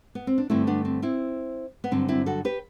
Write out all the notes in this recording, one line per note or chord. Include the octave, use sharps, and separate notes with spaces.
B3
C4
D4
G2 D3 A3 C4 E4
B3 D4
C4
C4 E4
B3
G2 D3 F#3 C4
C4 E4
F#4 A4
G4 B4